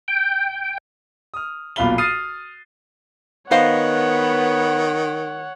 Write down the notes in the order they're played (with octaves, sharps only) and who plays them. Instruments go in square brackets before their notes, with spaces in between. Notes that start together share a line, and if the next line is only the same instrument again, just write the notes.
[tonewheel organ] G5
[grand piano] D#6 F6
B1 A#2 F4 F5 B5 G7
D#6 F6 A6 C7 D#7
[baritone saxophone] D#3 [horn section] B3 [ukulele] C5 D#5 F5 [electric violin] C#5 F#5